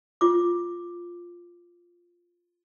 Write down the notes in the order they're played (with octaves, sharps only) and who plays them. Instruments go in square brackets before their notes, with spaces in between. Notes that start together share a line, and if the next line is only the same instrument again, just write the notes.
[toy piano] F4 D6